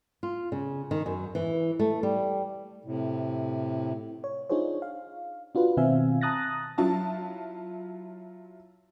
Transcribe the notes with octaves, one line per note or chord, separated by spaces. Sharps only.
F4
C#3
D#3
F#2
E3
A3
G3
A2 C3
C#5
D4 D#4 F4 G#4 C5 C#5
F5
D4 F4 F#4 B4
B2 D#3 C4 E5 F5 G#5
A5 A#5 D#6 F#6 A6 A#6
F#3 E4 F4 A5